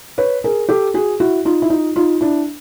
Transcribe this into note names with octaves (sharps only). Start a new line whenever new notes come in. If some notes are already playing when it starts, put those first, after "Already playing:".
B4 C#5
G#4 A#4
G4 A4
F#4 G#4
E4 F#4
D#4 F4
E4
D#4 F4
D#4 F4
D4 E4